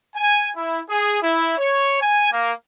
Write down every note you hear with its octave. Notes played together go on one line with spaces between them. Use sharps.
G#5
E4
G#4
E4
C#5
G#5
A#3